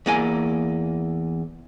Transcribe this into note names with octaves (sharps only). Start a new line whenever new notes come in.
E2 A#3 G#5